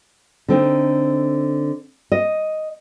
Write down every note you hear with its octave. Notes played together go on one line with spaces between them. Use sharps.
D3 C4 D#4
D#5